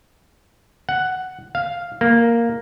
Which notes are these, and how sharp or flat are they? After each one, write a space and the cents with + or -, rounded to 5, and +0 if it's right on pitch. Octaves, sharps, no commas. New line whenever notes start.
F#5 +5
F5 +0
A#3 +0